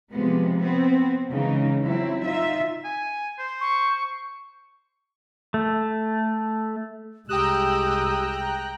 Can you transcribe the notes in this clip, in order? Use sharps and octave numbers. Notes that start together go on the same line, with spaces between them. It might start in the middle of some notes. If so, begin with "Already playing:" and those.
C3 F3 G#3 B3
B3 C4
C#3 E3 G#3 D#4
F#3 C4 E4
D#4 F4 E5
G#5
C5
C#6
A3
C2 G#3 G4 G5 A#5 D#6 E6 F#6